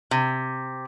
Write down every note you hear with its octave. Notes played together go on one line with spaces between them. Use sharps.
C3